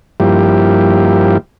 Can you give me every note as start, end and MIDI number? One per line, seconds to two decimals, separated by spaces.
0.20 1.37 43
0.20 1.37 53
0.20 1.37 58
0.20 1.37 64
0.20 1.37 67